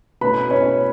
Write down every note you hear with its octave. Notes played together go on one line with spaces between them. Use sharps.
B2 A3 C#4 E4 B4 B5
C#4 C#5